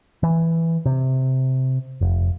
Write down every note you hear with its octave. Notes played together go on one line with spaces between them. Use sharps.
E3
C3
F1